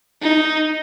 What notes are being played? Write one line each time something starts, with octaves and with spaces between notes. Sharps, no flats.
D#4